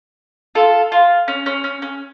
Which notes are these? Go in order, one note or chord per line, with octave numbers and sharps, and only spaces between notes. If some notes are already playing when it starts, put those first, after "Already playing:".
F4 A4
F4
C#4
C#4
C#4
C#4